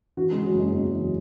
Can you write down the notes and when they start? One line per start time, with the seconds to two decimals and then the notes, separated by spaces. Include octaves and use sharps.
0.17 E3 F#4
0.31 G#3
0.36 C#3
0.45 F#3
0.54 F#1 G#3
0.73 E2 G#3
0.92 E3
1.00 F#3